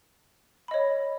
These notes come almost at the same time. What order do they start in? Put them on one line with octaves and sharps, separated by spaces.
B5 D#5 C#5